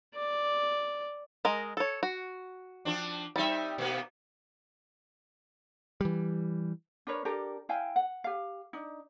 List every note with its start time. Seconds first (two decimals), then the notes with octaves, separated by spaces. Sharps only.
0.16 D5
1.45 G#3 A#4 D#5
1.77 A4 C#5
2.03 F#4
2.85 F3 C4 D4
3.36 G3 C4 D#4 E5
3.78 B2 A#3 B3
6.01 E3 G3
7.07 D4 A#4 B4 C#5
7.25 D4 G4 A4 A#4
7.69 E4 F5 G5 G#5
7.96 F#5
8.24 G4 F5
8.73 D4 D#4